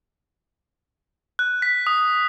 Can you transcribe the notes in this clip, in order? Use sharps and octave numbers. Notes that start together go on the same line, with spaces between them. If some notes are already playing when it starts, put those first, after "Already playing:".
F#6
B6
D#6